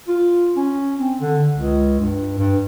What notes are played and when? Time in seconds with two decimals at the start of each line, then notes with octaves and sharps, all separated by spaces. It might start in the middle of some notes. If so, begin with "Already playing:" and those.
0.08 F4
0.56 C#4
0.99 C4
1.21 D3
1.56 C#2
2.00 G2
2.38 G2